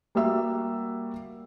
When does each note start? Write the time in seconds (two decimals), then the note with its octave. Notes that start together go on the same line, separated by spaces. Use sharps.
0.15 G3 A#3 F#4 E5 E6